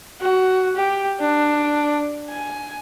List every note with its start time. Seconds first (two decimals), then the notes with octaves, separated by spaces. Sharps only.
0.21 F#4
0.76 G4
1.20 D4
2.30 G#5